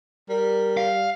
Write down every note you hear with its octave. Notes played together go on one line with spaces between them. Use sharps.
G3 A#4
F5